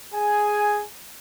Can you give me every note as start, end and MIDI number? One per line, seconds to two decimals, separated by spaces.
0.15 0.83 68
0.15 0.83 80